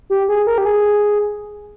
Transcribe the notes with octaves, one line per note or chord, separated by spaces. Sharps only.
G4
G#4
A#4
G4
G#4